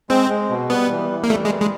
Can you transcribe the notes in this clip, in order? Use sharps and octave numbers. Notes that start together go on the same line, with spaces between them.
G#3 C4
G#3
B2
G3 B3
E3
E3
A#3
G3 A3
G#3
E3
G#3